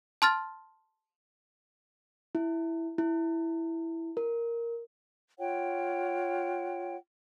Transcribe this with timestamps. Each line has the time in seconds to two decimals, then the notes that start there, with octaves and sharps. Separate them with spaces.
0.22 A5 C6 F6 A6
2.35 E4
2.98 E4
4.17 A#4
5.39 F4 C#5 F#5 G5